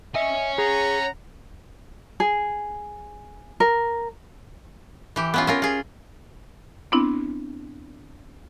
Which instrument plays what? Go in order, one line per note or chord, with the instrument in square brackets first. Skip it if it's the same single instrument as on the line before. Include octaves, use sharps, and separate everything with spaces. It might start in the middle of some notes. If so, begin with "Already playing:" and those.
[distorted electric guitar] C#5 G#5 [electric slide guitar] D#5 E5
[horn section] C#4 F#5 A#5 [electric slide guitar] G#4
[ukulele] G#4
A#4
[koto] E3 G4
B3 C#4 F4
C#4 F4 A#4
F4 G#4
[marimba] B3 C4 D4 E4